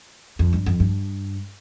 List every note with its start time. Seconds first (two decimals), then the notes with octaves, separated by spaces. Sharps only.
0.39 F2
0.53 G2
0.66 F2
0.80 G2